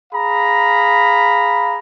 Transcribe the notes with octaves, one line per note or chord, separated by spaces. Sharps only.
G#4 F5 A#5 B5